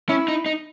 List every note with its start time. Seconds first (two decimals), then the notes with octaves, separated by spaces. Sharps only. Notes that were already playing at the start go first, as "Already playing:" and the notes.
0.09 C#4 E4
0.28 D#4
0.46 D#4